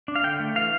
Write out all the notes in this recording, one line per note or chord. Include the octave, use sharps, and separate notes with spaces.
D4
F5
D3 G5
A3
E3 F5